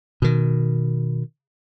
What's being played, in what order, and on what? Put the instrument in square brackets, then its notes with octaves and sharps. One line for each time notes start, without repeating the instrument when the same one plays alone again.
[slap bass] B2 D#3